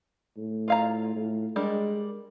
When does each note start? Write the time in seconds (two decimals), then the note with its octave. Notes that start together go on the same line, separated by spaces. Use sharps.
0.37 A2
0.68 F4 F5 A#5
1.15 A2
1.56 G3 G#3 D4 A#4